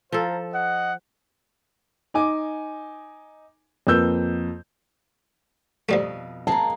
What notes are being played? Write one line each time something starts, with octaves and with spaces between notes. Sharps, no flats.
F3 A4 C5 F5 A#5
D#5 F#5
D#4 G#5 D6
F2 A#3 B4 E6 G6
F2 B2 F3 G3 A3 D#5
G#3 A#3 G#4 A5